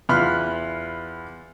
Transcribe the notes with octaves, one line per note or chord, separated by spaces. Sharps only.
E2 F4 F5 B5 F6 F#6